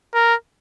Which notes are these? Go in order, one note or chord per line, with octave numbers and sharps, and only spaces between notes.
A#4